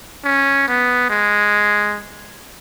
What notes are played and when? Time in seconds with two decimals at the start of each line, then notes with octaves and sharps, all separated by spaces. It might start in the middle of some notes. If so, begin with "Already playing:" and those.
0.25 C#4
0.68 B3
1.10 G#3